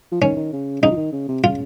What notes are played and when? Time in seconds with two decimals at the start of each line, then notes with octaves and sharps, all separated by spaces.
0.12 F3
0.22 D#3 C#4
0.37 D#3
0.53 C#3
0.82 C#3 D#4
0.91 F3
0.97 D#3
1.12 C#3
1.28 C3
1.44 C#3 F4